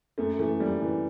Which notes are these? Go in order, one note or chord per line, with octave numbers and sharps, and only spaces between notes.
F#2 A3
E3 A3
F#2 G3
E3